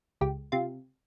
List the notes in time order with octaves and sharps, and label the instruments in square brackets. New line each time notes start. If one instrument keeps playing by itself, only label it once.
[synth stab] C#2 G4
C3 F4